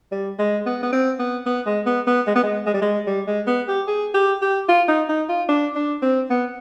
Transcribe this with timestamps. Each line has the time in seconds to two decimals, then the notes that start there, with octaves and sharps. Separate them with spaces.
0.12 G3
0.39 G#3
0.66 B3
0.83 B3
0.93 C4
1.19 B3
1.46 B3
1.66 G#3
1.86 B3
2.07 B3
2.27 G#3
2.35 B3
2.43 G#3
2.66 G#3
2.74 G3
2.82 G#3
3.07 G3
3.27 G#3
3.47 B3
3.68 G4
3.87 G#4
4.14 G4
4.42 G4
4.68 F4
4.88 D#4
5.09 D#4
5.29 F4
5.49 D4
5.76 D4
6.02 C4
6.30 B3